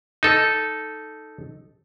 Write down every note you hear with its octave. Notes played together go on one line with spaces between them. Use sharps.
D#4 A4